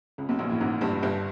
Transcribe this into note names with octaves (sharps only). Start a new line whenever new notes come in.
C#2 C#3
B1 B2
A#1 A#2
A1 A2
G#1 G#2
G1 G2
G1 G2